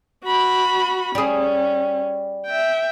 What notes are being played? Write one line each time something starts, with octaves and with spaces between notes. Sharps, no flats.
F#4 B5
G3 C#4 G#4
E5 G5